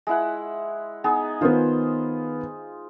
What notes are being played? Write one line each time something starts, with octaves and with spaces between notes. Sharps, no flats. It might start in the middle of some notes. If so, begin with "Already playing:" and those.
G#3 E4 F#5
B3 D#4 G#4
D#3 B3 F4 C5